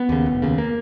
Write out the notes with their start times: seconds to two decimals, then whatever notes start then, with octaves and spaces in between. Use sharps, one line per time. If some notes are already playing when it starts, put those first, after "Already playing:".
Already playing: B3
0.09 D#2 C#3
0.26 F1
0.42 D#2 C#3
0.58 A#3